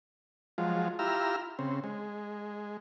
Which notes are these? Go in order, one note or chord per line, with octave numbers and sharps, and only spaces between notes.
F3 F#3 G#3 F4
E4 F4 G4 A#5 E6 F6
C#3 C4
G#3